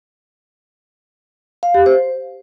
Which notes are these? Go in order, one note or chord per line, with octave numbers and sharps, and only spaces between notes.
F5
G4
C5